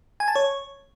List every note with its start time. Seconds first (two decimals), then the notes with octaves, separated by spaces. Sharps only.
0.20 G#5
0.28 A5
0.35 C#5